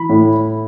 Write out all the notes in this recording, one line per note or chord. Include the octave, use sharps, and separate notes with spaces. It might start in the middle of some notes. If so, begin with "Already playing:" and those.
Already playing: E3 B5
A2